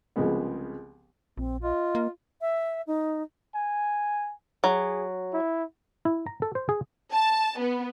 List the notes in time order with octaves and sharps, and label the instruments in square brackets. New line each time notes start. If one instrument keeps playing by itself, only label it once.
[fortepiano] C2 C#3 F3 G#3 B3
[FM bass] A#1 [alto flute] C4
[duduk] F4 [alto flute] D#5
[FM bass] A#3
[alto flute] E5
D#4
[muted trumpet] G#5
[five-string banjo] F#3 [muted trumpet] G#4
[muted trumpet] E4
[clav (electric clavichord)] E4
A#5
A4
C5
G#4
[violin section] A5
B3